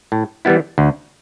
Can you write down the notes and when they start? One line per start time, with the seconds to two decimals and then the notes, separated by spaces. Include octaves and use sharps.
0.12 A2
0.45 E3 G3 B3 E4
0.78 D2